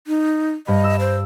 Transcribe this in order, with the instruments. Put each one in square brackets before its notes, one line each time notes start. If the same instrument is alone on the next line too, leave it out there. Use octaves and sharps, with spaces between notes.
[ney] D#4
[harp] G2 B5 [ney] D#5
[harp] E6
[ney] C5